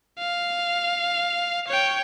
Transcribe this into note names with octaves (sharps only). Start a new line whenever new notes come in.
F5
C#5 G5